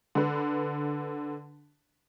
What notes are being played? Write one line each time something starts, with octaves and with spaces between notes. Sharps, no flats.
D3 B4